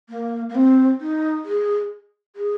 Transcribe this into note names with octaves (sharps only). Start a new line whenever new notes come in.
A#3
A#3
C4
D#4
G#4
G#4